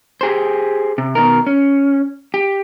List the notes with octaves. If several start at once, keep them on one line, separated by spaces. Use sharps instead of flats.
G4 G#4 C5
C3
B2 D#3 A#4
C#4
G4